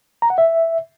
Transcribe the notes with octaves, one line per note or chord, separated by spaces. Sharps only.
A#5
F#5
E5